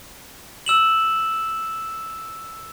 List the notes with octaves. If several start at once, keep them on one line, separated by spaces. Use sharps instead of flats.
E6 E7 F#7